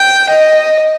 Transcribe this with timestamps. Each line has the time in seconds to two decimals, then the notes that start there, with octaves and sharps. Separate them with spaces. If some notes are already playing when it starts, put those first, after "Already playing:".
Already playing: G5
0.29 D#5